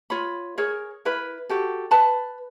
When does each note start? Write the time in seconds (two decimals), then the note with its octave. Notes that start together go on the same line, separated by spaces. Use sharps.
0.10 F4 C#5 B5
0.58 G#4 A#4 C#5
1.05 E4 A#4 B4 B5
1.49 F#4 G4 A4
1.91 B4 A5 B5